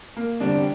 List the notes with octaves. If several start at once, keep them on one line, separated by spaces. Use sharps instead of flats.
A#3
E2 D3 G3 C4 D4 G4